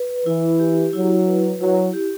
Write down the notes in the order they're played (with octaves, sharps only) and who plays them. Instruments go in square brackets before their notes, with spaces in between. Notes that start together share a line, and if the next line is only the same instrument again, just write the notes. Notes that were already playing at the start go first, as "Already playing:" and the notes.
Already playing: [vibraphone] B4
[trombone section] E3 [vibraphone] E4
[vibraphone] G4
[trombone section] F#3 [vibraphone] E4
[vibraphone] B4
[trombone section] F#3 [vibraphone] E4
[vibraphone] G4